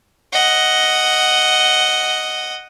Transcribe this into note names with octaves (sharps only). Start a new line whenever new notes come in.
D#5 F#5